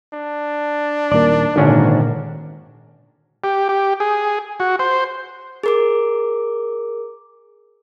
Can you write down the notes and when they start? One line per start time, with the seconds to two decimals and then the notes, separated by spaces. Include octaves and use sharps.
0.14 D4
1.12 D#1 D#2 A#3 D5
1.56 G#1 A#2 D3 D#3 C#4
3.44 G4
3.69 G4
4.00 G#4
4.60 F#4
4.79 C5
5.64 G#4 A#4 D6